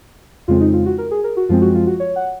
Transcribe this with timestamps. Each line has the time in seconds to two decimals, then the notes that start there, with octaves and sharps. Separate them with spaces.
0.48 F2 C#3 G#3 C4 F4
0.61 D#4
0.73 F4
0.86 F#4
0.98 A#4
1.11 G#4
1.24 A#4
1.37 F#4
1.49 F#2 F3 G#3 C4 F4
1.62 F#4
1.75 F4
1.87 F#4
2.00 C#5
2.16 F#5